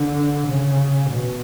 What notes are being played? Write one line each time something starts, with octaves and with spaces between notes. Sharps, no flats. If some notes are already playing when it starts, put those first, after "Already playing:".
Already playing: D3
C#3
B2